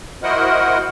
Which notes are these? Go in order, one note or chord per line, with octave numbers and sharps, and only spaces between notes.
E4 F#4 A#4 C5 D#5 F#5